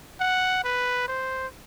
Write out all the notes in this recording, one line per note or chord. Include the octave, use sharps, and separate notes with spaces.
F#5
B4
C5